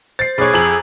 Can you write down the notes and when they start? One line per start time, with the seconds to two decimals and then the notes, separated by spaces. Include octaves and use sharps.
0.19 C5 A6 C7
0.38 B1 G#4 C#5 B5 D6 F#6
0.53 F2 G#5 A#5 E6 F#7